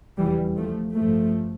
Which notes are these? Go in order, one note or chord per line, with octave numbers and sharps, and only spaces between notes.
F1 E2 C#3 E3 G3
F3 A3
A1 G2 F3 A3